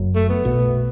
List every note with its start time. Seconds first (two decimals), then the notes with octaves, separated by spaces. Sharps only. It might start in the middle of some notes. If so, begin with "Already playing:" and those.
Already playing: F#1 F#2 F#3
0.15 A3
0.29 B3
0.44 B1 B2 A3